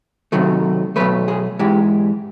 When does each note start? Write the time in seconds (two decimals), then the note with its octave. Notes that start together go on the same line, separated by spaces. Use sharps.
0.32 C3 D#3 F#3 A3
0.96 B2 F#3 A3 B4
1.28 G#4
1.59 G#2 E3 G#3 G4